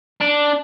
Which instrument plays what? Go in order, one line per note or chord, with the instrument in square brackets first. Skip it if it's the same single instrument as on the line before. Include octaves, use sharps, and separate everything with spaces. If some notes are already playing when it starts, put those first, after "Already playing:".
[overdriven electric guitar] D4